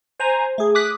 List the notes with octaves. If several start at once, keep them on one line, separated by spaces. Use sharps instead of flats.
C5 G#5 A#5
A3 G#4
D6 D#6 F#6 B6